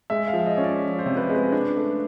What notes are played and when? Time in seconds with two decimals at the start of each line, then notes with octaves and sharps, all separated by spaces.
0.10 G#3 E5
0.28 F5
0.33 F3
0.46 D#5
0.57 C#4
0.64 D5
0.82 F3
0.99 C5
1.06 C3
1.17 B4
1.30 G#3 B4
1.52 D4
1.77 A3